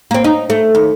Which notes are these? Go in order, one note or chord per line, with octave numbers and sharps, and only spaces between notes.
A#3 C4
D#4
A3
D#2